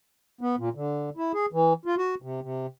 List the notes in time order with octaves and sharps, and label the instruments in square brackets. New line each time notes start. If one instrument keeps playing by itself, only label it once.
[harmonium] B3
A#2
D3
E4
G#4
E3
F4
F#4
C3
C3